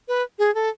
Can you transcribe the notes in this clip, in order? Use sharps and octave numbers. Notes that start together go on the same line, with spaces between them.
B4
G#4
A4